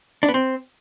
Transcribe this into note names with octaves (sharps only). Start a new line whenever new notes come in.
D4
B3
C4